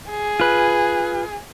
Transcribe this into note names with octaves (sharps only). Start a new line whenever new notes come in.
G#4
F4 B4